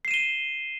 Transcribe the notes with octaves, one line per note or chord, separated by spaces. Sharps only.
C7 D#7 E7 G7